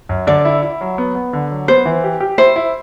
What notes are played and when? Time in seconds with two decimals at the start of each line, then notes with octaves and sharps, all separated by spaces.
0.09 F#2
0.27 D3 D5
0.45 E4
0.62 E4
0.81 F#3
0.98 B3
1.15 B3
1.33 D3
1.51 F#3
1.68 B3 C5
1.86 E3
2.04 G4
2.20 G4
2.38 E4 C5
2.56 E4